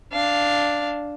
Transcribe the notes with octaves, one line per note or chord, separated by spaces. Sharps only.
D4 F5